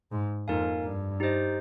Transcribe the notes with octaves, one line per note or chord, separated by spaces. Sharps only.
G#2
F2 A#3 D#4 A#4 F5 G#5
G2
D#4 G4 C5 D#5